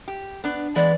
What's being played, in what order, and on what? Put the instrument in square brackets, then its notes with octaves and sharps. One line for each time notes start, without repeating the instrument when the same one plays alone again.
[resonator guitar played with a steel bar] G4
B3 D4
[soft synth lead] E3 [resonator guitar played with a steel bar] G#3 B3 [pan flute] D5